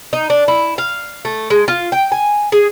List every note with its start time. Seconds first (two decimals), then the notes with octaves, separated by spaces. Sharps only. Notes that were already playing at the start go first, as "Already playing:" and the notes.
0.13 D#4
0.30 D4
0.48 E4
0.78 F5
1.25 A3
1.50 G#3
1.68 F4
1.92 G5
2.12 G#5
2.52 G#4